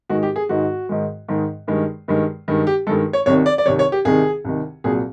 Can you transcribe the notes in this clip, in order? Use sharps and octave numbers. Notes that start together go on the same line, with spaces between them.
G#2 D#3 G#3 F#4
G4
G#4
G#2 D#3 G#3 F#4
G#2 D#3 G#3
G#2 D#3 G#3
G2 D#3 G#3
G2 D#3 G#3
G2 D#3 G#3
G4
G2 D#3 G#3 A4
C#5
C2 C3 D#3 C#5
D5
D5
C2 C3 D#3 C#5
C#5
G4
C2 C3 D#3 G#4
C2 C3 D#3
C2 A#2 F#3 G#4